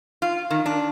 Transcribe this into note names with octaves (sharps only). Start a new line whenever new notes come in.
F4
D#3
D4